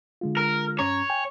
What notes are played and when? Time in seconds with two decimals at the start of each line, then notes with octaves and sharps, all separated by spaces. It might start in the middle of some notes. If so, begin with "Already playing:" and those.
0.21 D3 G#3 F4
0.37 A#4
0.79 G2 C#4 C#5 A#5
1.10 G5 G#5